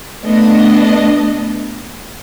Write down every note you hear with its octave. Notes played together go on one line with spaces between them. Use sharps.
A3 B3 D4 D#5